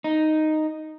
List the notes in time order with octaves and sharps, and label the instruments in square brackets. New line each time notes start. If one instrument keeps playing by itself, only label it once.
[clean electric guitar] D#4